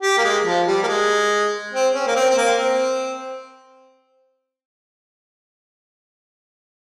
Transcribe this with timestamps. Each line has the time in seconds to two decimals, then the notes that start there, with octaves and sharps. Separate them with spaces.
0.03 G4
0.18 A#3
0.24 G#3
0.45 F3
0.67 G3
0.83 A#3
0.87 G#3
1.73 C4
1.94 C#4
2.07 A#3
2.16 C4
2.30 C4
2.37 A#3
2.58 C4